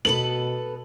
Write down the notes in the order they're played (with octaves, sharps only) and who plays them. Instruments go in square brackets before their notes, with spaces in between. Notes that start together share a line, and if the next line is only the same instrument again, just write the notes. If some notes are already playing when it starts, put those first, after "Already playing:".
[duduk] B2 [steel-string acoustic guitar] B3 A4 B4 [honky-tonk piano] F#7